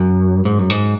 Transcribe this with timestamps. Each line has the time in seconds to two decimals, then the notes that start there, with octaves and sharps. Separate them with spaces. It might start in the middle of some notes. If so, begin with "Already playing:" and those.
Already playing: F#2
0.45 G#2
0.59 F#2
0.70 G#2